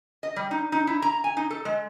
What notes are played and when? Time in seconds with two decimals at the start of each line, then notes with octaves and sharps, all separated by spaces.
0.23 D#5
0.36 G3
0.51 D#4
0.72 D#4
0.87 E4
1.02 A#5
1.24 G#5
1.37 D#4
1.50 A4
1.65 G#3